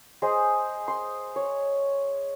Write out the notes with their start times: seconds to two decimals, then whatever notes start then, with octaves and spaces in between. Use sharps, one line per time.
0.22 G#4 C5 D#5
0.88 C6
1.36 C#5